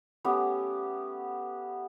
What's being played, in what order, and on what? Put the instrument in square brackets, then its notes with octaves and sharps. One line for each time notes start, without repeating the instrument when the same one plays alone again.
[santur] A3 B3 C#4 G4